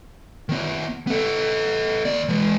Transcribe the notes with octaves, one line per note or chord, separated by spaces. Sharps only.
D#3 B3
B3 A4
D#2 D5
E3 G#3